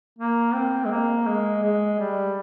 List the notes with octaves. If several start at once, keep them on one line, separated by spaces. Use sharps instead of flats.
A#3
C4
G#3
A#3
G#3
G#3
G3